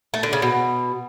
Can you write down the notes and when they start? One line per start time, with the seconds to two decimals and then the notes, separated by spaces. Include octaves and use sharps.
0.14 A3
0.23 D3
0.33 C#3
0.42 B2